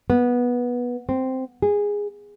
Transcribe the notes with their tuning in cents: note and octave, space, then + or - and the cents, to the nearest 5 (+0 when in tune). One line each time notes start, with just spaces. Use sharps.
B3 -15
C4 -5
G#4 -15